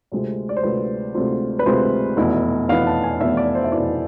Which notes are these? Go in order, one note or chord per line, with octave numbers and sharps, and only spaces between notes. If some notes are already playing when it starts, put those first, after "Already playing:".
D2 C3 G#3 C4 F4
D5
C5
D2 C3 G#3 C4 F4 B4
D2 C3 G#3 C4 F4
B4
D2 C3 G#3 C4 F4 C5
F1 E2 B2 B3 E4
F1 E2 B2 B3 E4 F5
A5
G#5
F1 E2 B2 B3 E4 E5
D5
C5
E5
F1 E2 B2 B3 E4 D5